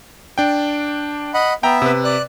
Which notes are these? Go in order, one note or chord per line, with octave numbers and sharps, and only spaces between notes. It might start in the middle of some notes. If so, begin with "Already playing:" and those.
D4 G5
D#5 F#5 B5
B3 E5 G5 A#5
C3 B4
D5 F#6